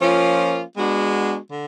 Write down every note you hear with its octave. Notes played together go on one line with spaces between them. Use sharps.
F3 A#3 C#4 F4
G#3 B3 D4 F#4
D3